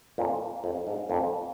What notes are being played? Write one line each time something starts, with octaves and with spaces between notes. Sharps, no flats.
F2 A#2
F2
G#2
F2 A#2